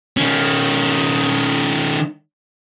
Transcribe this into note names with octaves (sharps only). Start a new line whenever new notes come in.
D#3 C#4